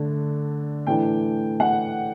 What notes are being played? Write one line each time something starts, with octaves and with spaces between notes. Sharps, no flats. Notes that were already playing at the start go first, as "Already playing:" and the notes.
Already playing: D3 A3 D4
A2 E3 A3 D4 G5
F#5